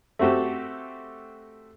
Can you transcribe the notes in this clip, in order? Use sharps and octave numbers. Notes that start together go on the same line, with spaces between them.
A3 C4 F#4 G4 A4